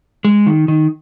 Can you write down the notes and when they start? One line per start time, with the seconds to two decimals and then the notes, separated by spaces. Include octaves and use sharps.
0.25 G#3
0.47 D#3
0.68 D#3